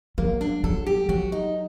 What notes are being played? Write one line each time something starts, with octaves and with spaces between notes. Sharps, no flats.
F#3 A#3
D4
F#3 A4
G4
F#3 F#4
D#4